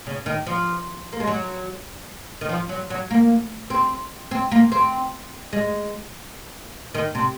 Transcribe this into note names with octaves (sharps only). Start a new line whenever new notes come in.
C#3
D#3
F3
A#3
G#3
F#3
D#3
F3
F#3
F#3
A#3
C4
C4
A#3
C4
G#3
D#3
C3